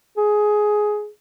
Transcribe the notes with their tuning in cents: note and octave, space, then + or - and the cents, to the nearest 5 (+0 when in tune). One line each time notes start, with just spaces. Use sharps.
G#4 +15